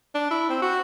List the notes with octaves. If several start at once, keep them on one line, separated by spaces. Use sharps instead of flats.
D4
E4
C4
F#4